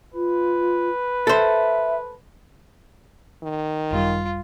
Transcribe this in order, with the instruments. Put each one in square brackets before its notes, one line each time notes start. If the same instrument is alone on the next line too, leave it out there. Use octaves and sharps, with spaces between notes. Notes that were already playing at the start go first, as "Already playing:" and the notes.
[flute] F4 [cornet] B4
[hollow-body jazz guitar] A4 C5 [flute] E5
[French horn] D#3
[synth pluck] G#1 F#2 G3 [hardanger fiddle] F4